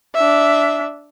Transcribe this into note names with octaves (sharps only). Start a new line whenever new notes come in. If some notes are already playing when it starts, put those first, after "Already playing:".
D4 E5